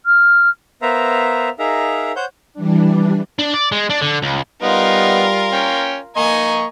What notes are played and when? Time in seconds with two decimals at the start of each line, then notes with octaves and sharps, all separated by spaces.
0.06 F6
0.82 B3 A#4 C5 E5 F5 A#5
1.59 D#4 G#4 A#4 E5 F5 A#5
2.16 C5 C#5 F#5 G6
2.54 E3 G3 D4
3.39 D4
3.54 D5
3.72 G#3
3.90 D4
4.02 D3
4.23 C#2
4.62 G3 B3 D#4 F4 A#4 F#5
5.53 C#4 G5
6.16 A#3 D#5 G#5 A#5 C#6